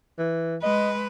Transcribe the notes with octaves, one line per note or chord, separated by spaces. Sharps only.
E3
G#3 B4 D#5